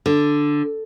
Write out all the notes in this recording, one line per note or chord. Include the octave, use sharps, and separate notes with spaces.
D3